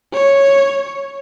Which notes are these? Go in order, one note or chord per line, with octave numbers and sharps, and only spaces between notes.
C#5